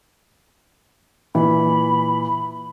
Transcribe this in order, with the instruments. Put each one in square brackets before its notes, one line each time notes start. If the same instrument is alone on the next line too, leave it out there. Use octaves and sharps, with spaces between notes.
[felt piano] A#2 E3 [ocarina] B5